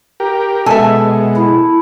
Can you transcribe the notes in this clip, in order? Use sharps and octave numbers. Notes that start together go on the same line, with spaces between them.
G4 A#4
B2 G#3 A4 E5 G#5
E4